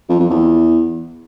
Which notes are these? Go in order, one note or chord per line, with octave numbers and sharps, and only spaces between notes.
F2
F2
E2